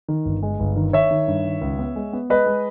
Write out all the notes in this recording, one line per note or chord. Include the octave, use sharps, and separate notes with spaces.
D#3
G1
G#3
G1
D#3
D#3 C#5 E5
D#3
G2
D#3
C#2
B3
G#3
B3
G#3 B4 D#5
G#3